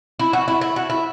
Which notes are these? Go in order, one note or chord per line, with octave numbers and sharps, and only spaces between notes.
E4
F#4
E4
E4
F#4
E4